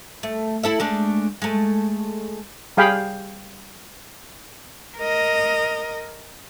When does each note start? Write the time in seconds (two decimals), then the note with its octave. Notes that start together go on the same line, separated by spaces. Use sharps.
0.23 A3
0.63 E4 A4 E5
0.80 G#3 A3 D4
1.42 G#3 A3
2.77 G3 G#4 F5 G5 B5
4.98 A#4 D#5